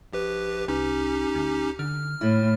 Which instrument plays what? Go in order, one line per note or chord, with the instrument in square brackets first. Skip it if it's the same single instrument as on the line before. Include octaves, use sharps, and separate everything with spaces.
[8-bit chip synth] A#1 G4 B4
[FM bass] C2 [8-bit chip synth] C#4 D#4 G4
[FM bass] D2
[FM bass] D3 [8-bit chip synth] F6
[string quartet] A2 [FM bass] E4